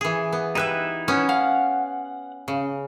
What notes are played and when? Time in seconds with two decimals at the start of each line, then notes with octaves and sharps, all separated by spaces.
0.01 E3 G#4
0.33 B3
0.55 D#4 E4 G4 B4 E5 F#6
1.08 B3 C#4
1.29 F5 F#5
2.48 C#3